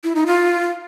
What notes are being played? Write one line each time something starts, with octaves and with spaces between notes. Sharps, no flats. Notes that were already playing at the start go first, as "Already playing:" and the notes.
E4
D#4
F4